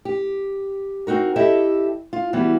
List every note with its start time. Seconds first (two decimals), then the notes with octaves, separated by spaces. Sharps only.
0.05 G4
1.07 C4 D#4 F#4 A#4
1.36 E4 G4 A4 D#5 E5
2.13 F4
2.33 E3 G3 B3 F#4